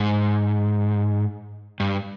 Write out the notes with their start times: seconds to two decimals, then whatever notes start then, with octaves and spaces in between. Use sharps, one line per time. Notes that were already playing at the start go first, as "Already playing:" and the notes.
Already playing: G#2
1.80 G2